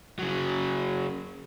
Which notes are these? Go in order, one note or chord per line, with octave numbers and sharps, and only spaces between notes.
C#3 F#3